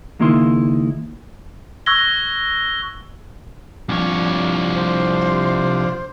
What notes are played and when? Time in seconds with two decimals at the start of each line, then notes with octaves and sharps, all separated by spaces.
0.20 C#2 D#3 A#3 D#4 E4 C6
1.86 C#6 E6 F#6 G#6 A#6 G7
3.89 C2 F3 D4 C#5
4.74 C5